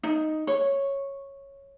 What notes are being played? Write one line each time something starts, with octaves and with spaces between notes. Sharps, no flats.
D#4
C#5